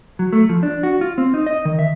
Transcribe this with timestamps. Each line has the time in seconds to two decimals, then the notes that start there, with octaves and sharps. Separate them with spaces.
0.19 F#3
0.33 A3
0.49 F3
0.63 D4
0.83 F#4
1.01 F4
1.18 C4
1.34 D#4
1.46 D#5
1.65 D#3
1.79 E5